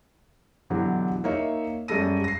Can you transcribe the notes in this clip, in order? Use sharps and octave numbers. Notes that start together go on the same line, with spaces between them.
B2 D3 E3 F#3 G4
A#3 D#4 C#5 D#5 E5
F#2 G3 G#3 A4 A#6 D#7
A#6 C7